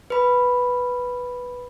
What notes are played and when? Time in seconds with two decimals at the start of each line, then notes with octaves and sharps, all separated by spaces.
0.10 B4 B5